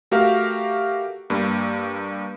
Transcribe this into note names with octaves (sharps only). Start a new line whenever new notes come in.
A3 F#4 G4 A#4 F5
G2 A#3